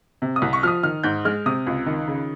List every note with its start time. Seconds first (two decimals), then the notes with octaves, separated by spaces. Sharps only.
0.22 C3
0.36 D#6
0.42 C2
0.53 C#6
0.63 F3 F6
0.68 D#6
0.83 D#3 F6
1.04 G#2 G6
1.25 G#3 F6
1.46 C3 D#6
1.67 C#2
1.86 D#3
2.08 C#3